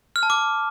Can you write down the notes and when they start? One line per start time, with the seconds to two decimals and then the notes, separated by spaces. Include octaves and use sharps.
0.16 F6
0.23 A5
0.30 D6